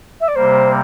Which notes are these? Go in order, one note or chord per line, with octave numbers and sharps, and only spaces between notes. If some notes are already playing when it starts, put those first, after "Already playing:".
E5
D5
C3 G3 A#3 C5